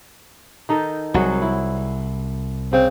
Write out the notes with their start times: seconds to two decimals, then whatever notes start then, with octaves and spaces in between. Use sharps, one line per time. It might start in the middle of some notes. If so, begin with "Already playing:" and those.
0.69 D#3 D#4 A4
1.14 C2 F#3 F#4 G#4
1.42 E4
2.73 C#3 C4